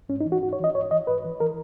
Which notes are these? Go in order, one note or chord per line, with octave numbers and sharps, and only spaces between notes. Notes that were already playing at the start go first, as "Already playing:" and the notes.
G#2 C#4
D#4
E3
F#4
G#2 F#4
C#5
E3 D#5
G#2 C#5
E3 D#5
G#2 B4
E3
E3 A#4